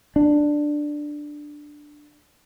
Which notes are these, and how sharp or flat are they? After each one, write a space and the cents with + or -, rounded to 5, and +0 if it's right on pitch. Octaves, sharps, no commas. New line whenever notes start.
D4 +10